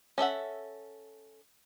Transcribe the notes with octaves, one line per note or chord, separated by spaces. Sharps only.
C#4 A4 E5 F#5